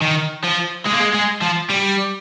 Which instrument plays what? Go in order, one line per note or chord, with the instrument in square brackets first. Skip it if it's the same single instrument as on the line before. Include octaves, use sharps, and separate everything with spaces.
[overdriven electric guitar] D#3
F3
G#3
A#3
G#3
G#3
F3
G3